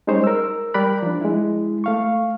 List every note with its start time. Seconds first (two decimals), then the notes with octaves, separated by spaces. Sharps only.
0.07 G3 G#3 C#4 D#4 C5 C#5
0.24 A#4 E6
0.74 G3 A#4 D5 G5 B5 F#6
1.03 F3 D4
1.21 G#3 E4
1.84 A3 F5 C#6